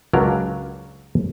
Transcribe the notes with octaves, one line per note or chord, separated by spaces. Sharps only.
C#2 F#3 D4 A#4 A#5